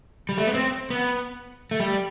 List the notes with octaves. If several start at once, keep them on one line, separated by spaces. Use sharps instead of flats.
G3
A3
B3
C4
B3
A3
G3